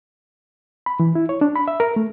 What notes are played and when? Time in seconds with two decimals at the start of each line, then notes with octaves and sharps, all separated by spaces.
0.86 B5
1.00 E3
1.15 E4
1.29 C#5
1.41 D4
1.56 B5
1.68 E5
1.80 A#4
1.96 A3